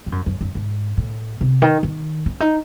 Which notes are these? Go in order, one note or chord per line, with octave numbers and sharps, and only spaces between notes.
G#2
F#2
F#2
F#2
G#2
A2
C3
D#3
D#3
C#4
D#4